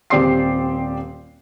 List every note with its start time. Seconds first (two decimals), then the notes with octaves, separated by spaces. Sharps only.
0.10 D#1 C4 G4 D5 C6 C7